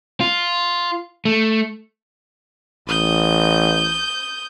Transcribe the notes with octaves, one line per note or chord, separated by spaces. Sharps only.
F4
A3
A1 D#6 G6